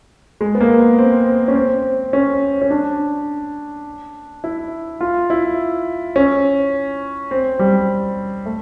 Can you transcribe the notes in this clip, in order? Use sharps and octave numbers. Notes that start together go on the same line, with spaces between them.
G#3
B3
A#3
C4
C#4
C4
C#4
C#4
D4
E4
F4
E4
C#4
C4
G3
A3